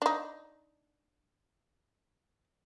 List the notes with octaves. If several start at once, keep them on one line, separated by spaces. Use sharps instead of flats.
D4 D#4